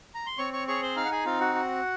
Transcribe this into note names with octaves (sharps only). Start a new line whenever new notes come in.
A#5
C6
C4 C#5 C#6
C#5 C#6
G#4 C#5 C#6
C5 C6
D#4 F5 F6
F#5
G#4 G#5
C4 F4 F5
F#4 F#5
F#4